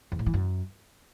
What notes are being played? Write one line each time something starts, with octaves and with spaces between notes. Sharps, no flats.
E2
A2
E3
F#2